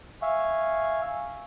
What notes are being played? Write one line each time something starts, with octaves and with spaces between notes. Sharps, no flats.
E5 F5 G#5 C#6